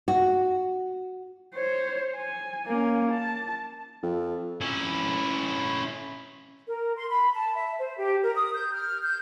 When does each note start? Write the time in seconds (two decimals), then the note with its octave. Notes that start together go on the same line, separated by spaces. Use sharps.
0.08 F#4
1.55 C5 C#5
2.16 G#5
2.66 A#3 C#4
3.11 A5
4.03 F2
4.61 C#4 E4
6.68 A#4
6.95 C6
7.10 B5
7.36 A5
7.55 E5
7.78 C5
7.98 G4
8.22 A#4
8.35 D#6
8.54 G6
8.73 F6
9.03 G6